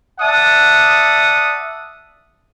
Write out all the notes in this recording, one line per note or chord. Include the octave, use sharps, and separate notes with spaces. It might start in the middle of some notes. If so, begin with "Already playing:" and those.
D5 E5 F#5 A5 D#6